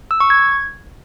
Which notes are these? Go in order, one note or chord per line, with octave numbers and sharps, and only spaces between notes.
E6
C#6
G#6